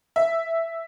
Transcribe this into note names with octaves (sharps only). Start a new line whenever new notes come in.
E5